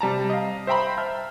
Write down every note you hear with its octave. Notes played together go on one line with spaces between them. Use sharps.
C3 G3 A5 A#5
D#5 F5
C5 E5 G5 A#5 B5
E5 A5 F6